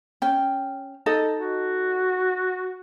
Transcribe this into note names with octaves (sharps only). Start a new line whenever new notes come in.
C#4 G5
D#4 A4 D#5
F#4